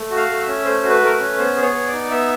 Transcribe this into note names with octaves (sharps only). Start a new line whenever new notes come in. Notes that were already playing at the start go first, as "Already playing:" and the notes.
Already playing: A3
F#4
F5
A3
E5
C#4
A3 C5
F#4
B4
A3 A#4
B4
C#4
B3 C5
G#4
C#5
B3
D5
D#4
B3 E5